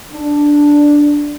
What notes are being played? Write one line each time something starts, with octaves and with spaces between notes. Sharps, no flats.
D4